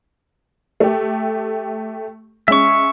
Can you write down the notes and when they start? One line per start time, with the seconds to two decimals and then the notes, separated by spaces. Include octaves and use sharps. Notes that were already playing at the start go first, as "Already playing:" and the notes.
0.80 A3 G4
2.48 G#3 C#4 E5 C#6